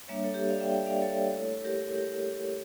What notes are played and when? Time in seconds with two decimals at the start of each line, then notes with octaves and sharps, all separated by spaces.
0.08 G3 A#3 D4 C#5 E5
0.24 A4 C#5
0.34 G4
0.39 A4
0.50 D5 F5
0.61 E5 G5
0.71 E5 G5
0.86 D5 F5
1.02 A4 C#5
1.33 A3 E4
1.64 G4 A#4
1.95 G4 A#4